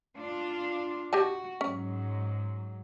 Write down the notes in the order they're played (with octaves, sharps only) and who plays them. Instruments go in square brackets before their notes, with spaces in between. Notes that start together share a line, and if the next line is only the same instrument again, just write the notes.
[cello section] D4 F4
[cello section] F#4 [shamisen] G4 D#5 A5
[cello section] G#2 F#3 [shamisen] C#4